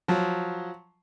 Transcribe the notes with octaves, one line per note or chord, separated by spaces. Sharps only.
F3 F#3